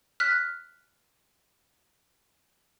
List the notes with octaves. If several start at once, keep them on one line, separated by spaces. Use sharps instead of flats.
F6 F#6 B6